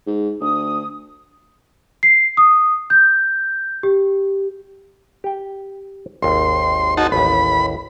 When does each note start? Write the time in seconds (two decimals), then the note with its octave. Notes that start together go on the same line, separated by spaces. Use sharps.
0.07 G#2
0.41 D2 D#6
2.03 C7
2.37 D#6
2.90 G6
3.83 G4
5.24 G4 G5
6.22 G#1 D#2 C6
6.97 D#4 F#4 A5
7.12 A1 D#2 B5